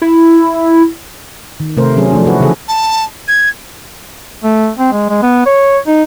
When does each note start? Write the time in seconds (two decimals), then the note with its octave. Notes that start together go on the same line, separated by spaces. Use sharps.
0.02 E4
1.60 D#3
1.77 C3 A3 A#4 C5
1.97 F#3 C#4 G#4
2.12 F3 A3 D4
2.25 E4 F#4 B4
2.40 C#3 E3 G#4 A4
2.68 A5
3.28 G#6
4.44 A3
4.79 C4
4.92 G#3
5.10 G#3
5.23 B3
5.46 C#5
5.87 D#4